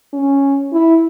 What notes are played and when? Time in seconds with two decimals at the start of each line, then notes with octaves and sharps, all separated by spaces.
0.13 C#4
0.73 E4